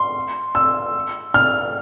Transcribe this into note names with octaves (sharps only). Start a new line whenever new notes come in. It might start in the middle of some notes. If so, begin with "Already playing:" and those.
Already playing: C6
E6
F6